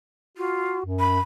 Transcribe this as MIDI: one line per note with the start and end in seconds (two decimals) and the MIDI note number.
0.37 0.79 65
0.37 0.81 66
0.85 1.20 42
1.00 1.21 83